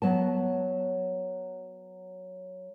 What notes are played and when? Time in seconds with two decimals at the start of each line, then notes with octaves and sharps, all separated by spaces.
0.02 F#3 B3 A5